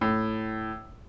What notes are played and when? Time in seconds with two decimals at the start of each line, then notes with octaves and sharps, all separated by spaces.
0.01 A2